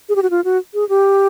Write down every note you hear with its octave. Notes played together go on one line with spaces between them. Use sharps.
G#4
G4
F#4
F4
F#4
G#4
G4